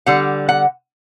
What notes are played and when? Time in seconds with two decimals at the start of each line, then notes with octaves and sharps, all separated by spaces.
0.06 D3 G3 F#5
0.49 F#5